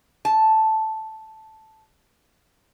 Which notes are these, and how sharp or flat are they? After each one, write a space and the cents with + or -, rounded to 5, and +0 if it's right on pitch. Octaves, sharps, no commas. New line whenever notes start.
A5 -5